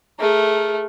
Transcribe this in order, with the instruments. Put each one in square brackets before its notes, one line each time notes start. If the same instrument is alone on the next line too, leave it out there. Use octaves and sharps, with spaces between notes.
[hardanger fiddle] A3 [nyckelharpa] G#4 A#4